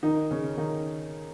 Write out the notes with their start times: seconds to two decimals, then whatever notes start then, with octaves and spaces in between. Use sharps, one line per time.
0.03 D#3 D#4
0.31 C#3 C#4
0.57 D#3 D#4